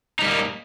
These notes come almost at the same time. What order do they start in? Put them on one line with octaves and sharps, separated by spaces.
D#4 G3 A#3